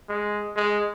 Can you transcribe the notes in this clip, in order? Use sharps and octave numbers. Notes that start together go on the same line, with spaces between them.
G#3
G#3